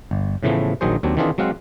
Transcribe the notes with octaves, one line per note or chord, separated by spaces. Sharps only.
G1
A2 C#3 E3 F3 A3 B3
A#1 D#3 F#3 G#4 C5
D#2 F#3 C4 D4
D#3 E3 C4 D4 F4 G#4
F#3 G#3 C4 F5 F#5